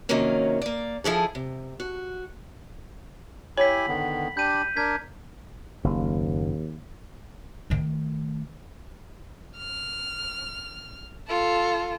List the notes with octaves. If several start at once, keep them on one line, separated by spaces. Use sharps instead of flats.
C3 D#3 F3 F#3 A#3 C#4
A#3 D5
F3 E4 G#4 A4
C3
F#4
E4 G4 C#5 G#5 B6 F#7
D3 D#3 B3
D4 G4 B5 G6 D#7
D4 A#4 G#6 B6
F#1 D#2
D#3 A3
F6
F4 A4